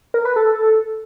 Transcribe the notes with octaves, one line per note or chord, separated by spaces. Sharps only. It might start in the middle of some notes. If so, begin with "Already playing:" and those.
A#4
B4
A4